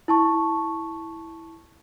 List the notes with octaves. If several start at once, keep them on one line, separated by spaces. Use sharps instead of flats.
E4 A5 C#6